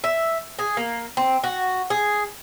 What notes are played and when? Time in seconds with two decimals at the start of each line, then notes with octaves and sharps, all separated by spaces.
0.04 E5
0.59 G#4
0.77 A#3
1.17 C4
1.44 F#4
1.90 G#4